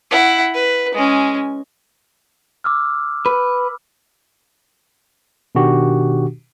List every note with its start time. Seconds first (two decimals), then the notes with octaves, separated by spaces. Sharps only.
0.11 E4 F#5
0.54 B4
0.94 G#3 C#4
2.64 D6 E6 F6
3.26 B4
5.55 B2 D#3 D4 F#4 G4